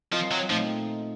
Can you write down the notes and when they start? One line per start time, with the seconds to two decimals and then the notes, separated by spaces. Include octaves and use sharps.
0.13 F3 C4 F4 A#4 D#5
0.31 F#3
0.50 A#2 F3 A3 C4 D#4